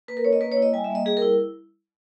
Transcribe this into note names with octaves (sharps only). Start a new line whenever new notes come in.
A#3 B4
A#4
C#4 C#5
D#5
A#3 B4
C#5
E4
D#5
G3 G#5
E5
A#3
D#5
G3 G#4
A#4
E4